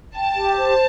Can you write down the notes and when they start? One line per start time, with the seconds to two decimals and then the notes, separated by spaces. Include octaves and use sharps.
0.15 G5 A5
0.35 G4
0.56 C5